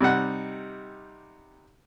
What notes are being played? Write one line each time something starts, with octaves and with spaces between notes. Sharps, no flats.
C3 G3 D#4 F#5